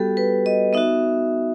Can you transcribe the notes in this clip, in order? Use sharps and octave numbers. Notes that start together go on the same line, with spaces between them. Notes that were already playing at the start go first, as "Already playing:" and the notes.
Already playing: G3 B3 F#4 G4 A4
B4
D#5
B3 D#4 F#4 E5